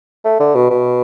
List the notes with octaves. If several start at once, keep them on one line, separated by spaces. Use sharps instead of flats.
A3
D3
B2
B2